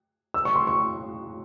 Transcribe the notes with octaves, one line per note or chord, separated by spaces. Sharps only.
E6
C#6
C6
C#6